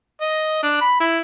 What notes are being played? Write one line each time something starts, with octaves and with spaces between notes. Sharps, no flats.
D#5
D4
B5
E4